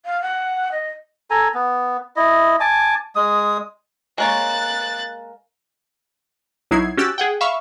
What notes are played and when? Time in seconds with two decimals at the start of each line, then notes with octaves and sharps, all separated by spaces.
0.06 F5
0.22 F#5
0.72 D#5
1.30 A4 G#5 A#5
1.54 B3
2.16 E4 D#5
2.60 G#5 A5 D6
3.16 G#3 D#6
4.18 G#3 A#3 C#5 F#6 A6
6.71 B1 F#3 D#4 E4 G#6 C7
6.97 C#4 F#4 G4 E6 F#6 A6
7.18 G#4 F#5 G5
7.41 E5 F5 B5 C#6